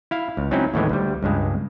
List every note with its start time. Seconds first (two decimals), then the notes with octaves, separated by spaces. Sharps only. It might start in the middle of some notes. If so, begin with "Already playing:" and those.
0.11 E4 F5
0.37 C#2
0.51 F#3 C4 C#4 D#4 E4
0.74 D#2 A2 E3 G#3
0.89 D2 G3
1.23 C#2 G2 G#3